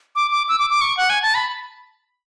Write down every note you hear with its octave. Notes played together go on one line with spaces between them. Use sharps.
D6
D6
E6
D6
D6
C#6
F#5
G#5
A5
B5